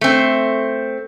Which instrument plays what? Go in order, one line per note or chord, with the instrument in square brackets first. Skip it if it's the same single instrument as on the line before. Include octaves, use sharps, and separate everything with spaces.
[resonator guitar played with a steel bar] A3 C4